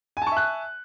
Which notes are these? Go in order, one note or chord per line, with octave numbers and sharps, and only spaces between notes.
E5 G#5 A5 C#6 F#6